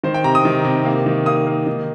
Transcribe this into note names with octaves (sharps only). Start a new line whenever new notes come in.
D#3 C5
G5
C3 A#5
D#6
D#3
C3
A#3
D#3
A#3 D#6
A#3
D#3